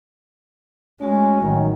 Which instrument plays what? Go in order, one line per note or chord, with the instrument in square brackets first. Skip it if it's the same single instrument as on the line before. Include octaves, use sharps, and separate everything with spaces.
[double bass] G#3 [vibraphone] A3 F#4 G#5 [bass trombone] C#4
[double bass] A1 [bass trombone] F#2 [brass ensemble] D#3